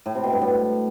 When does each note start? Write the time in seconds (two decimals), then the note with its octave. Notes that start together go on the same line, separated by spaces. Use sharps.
0.06 A2
0.15 C3
0.24 B2
0.33 G2
0.42 A2